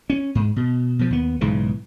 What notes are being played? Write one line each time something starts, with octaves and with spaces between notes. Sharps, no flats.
C#4
G#2
B2
B2 F3
D#2 B3
B1 G#2 C#3 E3